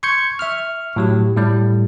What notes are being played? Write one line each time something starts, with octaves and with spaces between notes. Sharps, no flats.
C6 C#6 G6 G#6 C#7
E5 C#6 F6
A2 F#3 G4
A2 G3 A3